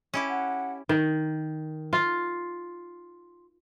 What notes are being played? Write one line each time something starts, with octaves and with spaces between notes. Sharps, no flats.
C#4 E4 G4
F#5
D#3
F4